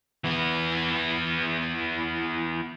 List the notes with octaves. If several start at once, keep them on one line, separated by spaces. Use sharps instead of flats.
E3 B3